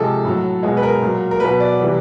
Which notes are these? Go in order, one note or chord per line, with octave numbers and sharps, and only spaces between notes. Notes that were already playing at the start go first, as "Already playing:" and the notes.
Already playing: C3 F3 G#3 A4
A2 F#3
B2 G#3
B4
A#4
A#2 F#3
A#4
B2 F#3 B4
D5
C3 E3 G3